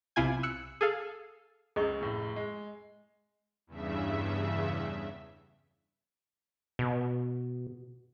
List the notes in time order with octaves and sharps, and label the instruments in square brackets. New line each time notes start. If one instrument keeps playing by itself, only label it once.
[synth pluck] B1 C3 E4 F4 G#5 G#6
E6 F#6 C#7
G#4 A4 F5
[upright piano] C#2 C#3 [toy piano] G#4 D#5 C#6
[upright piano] F1 A2
G#3
[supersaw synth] E2 G2 C#3 E5
[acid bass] B2